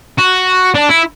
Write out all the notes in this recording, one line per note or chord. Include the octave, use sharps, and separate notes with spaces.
F#4
D4
E4